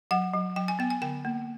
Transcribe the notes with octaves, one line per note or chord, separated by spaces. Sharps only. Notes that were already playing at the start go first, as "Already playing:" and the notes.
F#3 F#5
F#3
F#3 G5
G#5
B3 G5
G#5
D3 G5
A#3